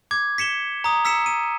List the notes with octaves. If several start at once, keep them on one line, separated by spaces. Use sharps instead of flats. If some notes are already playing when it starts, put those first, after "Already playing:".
D6 G#6
B6 C#7 E7 G7
A#5 D#6
E6 B6 C#7 E7
D#7